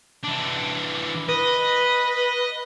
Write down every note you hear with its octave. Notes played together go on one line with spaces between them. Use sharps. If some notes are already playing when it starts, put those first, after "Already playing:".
E3 D4
B4 D#5